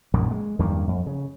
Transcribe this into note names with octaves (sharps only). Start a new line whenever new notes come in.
A#1 F#2 A#2 D#3
G#3
E2 G2 D#3 A#3
F2
C#3